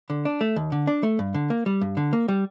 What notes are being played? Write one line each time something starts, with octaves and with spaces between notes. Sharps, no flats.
D3
D4
A3
D#2
D3
D4
A3
G2
D3
A#3
G3
G2
D3
A#3
G3